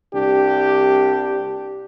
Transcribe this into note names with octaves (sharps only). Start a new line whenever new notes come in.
C2 D4 G4